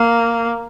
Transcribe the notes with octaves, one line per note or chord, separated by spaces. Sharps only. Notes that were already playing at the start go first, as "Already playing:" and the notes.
Already playing: A#3